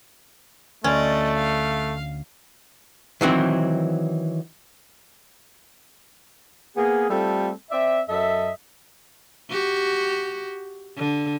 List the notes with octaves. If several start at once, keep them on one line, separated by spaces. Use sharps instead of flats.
D2 A3 C#4 D5 D#5 C6
F5
D#3 E3 F#3 C4
A#3 B3 G#4
G3 A3 C4 F4 A4
C4 D5 E5
F#2 A4 D#5 E5
F#4 G4
D3